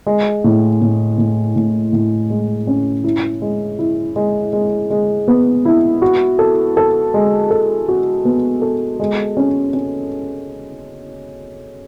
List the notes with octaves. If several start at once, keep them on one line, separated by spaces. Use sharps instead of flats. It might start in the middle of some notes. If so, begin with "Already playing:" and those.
G#3
A2
A2
A2
A2
A2
G#3
C#4
E4
G#3
E4
G#3
G#3
G#3
B3
E4
F#4
A4
A4
G#3
A4
F#4
B3
A4
G#3
C#4
C#4